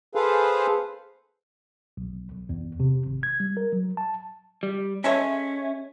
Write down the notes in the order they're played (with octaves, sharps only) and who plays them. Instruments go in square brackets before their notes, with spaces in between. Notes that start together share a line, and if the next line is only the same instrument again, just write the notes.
[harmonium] G#4 A4 B4 C5 F5
[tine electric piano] B1
B1
E2
C3
G#1
G#6
G3
A#4
F#3
A5
[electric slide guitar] G3
[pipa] G#3 A4 C#5 [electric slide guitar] C#4 [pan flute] E5